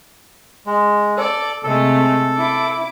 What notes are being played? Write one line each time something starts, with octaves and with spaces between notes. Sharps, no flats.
G#3
A4 D5
C3 G#3 A3 A4
E4 D6